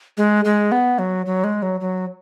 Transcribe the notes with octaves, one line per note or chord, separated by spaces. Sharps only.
G#3
G#3
B3
F#3
F#3
G#3
F#3
F#3